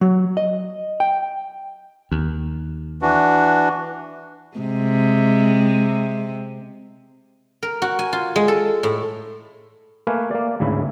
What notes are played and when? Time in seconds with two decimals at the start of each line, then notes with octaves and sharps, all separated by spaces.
0.01 F#3
0.37 D#5
1.00 G5
2.12 D#2
3.02 E3 D4 F#4
4.57 C3 G#3
7.63 A#4
7.82 F#4
7.99 G#5
8.13 F4
8.36 G#3
8.48 A4
8.83 A2
10.07 A3 A#3 B4 F5 G#5
10.31 A#3 D5
10.60 G#1 D2 C#3 E4 E5